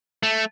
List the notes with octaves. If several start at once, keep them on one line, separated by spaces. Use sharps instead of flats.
A3